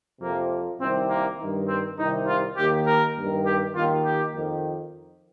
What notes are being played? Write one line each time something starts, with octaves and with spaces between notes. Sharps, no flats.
F2 C3 F3 A#3
C2 C3 D#3 C4
A#3
G2 D#3
C4
C2 C3 D#3 D#4
F4
D#2 D#3 G4
A#4
G2 D#3
G4
D#2 D#3 F4
G4
F2 D#3